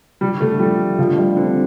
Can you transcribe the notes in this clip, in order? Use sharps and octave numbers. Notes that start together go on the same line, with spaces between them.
D3 G3
D3 A3
F3 G3
A3
D3 F3
G3
D3 C4